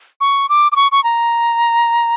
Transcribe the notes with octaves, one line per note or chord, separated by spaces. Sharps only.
C#6
D6
D6
C#6
C#6
A#5